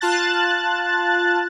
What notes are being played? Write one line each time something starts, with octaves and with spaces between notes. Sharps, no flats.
F4 A5 F#6 A6